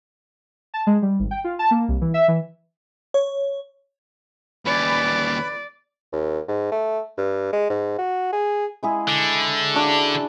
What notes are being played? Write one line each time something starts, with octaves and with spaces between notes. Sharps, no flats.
A5
G#3
G3
G#1
G5
F4
A5
A#3
C2
E3
E5
E3
C#5
D#2 C#4 B4 D5 B5
D#2
G#2
A3
G2
G#3
G#2
F#4
G#4
G#3 E4 G#4
D3
D4 F#4